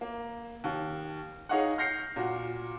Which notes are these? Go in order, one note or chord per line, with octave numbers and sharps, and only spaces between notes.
A#3
D#2
D#4 G#4 C#5 D#5 F5 F#5
F6 G6 A#6 C7 C#7
A#2 F#4